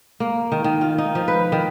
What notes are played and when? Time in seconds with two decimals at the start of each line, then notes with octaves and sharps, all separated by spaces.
0.20 A#3
0.52 D#3
0.64 D#3
0.81 F4
0.98 D#4
1.15 F3
1.28 B4
1.52 D#3